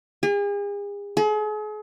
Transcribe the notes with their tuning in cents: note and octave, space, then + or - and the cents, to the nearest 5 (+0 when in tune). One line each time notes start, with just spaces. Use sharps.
G#4 -40
G#4 +40